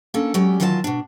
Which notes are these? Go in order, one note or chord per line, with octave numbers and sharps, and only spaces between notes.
A#3 C#4 D4 A4
F#3 G#3 C#4 G4 D5
D#3 E3 F#3 F4 C5 A5
B2 D4